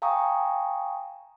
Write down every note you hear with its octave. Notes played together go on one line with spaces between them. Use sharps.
F5 G5 G#5 A#5 C#6 D#6